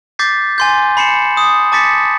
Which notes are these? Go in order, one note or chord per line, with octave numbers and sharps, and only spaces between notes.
D6 G6 A6 B6 C7
G#5 C6 G6
B5 C7 C#7 E7 F#7
D#6
A5 D6 A6 B6 C#7